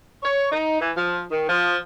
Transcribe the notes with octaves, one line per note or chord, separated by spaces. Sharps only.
C#5
D#4
E3
F3
D#3
F3